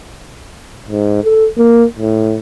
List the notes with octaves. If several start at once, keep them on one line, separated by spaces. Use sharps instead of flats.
G#2
A4
A#3
A2